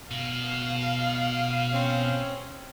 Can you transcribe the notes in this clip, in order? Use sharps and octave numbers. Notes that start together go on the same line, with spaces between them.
B2 F5
C4 C#4